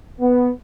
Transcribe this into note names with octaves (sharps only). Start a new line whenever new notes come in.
B3